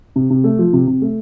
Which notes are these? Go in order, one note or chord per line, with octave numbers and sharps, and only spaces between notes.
C3
C3
A3
F3
C3
C3
A3